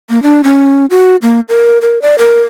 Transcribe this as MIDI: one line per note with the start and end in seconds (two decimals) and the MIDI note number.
0.10 0.22 58
0.23 0.42 62
0.44 0.86 61
0.90 1.16 66
1.22 1.40 58
1.49 1.78 70
1.82 2.01 70
2.02 2.15 74
2.18 2.42 70